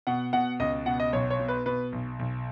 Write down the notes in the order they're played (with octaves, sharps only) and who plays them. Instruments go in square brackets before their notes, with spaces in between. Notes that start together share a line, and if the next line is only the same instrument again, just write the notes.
[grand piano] B2 F#5
B2 F#5
C#2 D#5
B2 F#5
D#5
B1 C#5
C#5
B2
B4
B2 B4
B1
B1